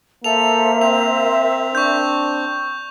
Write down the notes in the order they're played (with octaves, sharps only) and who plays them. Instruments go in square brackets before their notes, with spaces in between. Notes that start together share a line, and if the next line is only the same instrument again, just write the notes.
[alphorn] A#3 [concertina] A4 [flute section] A#4 C5 E5 [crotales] F7
[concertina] C4 [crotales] F7
[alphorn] D4 [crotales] C#6 G6